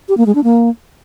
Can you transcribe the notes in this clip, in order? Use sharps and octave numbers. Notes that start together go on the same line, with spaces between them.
G4
A#3
G#3
D4
A#3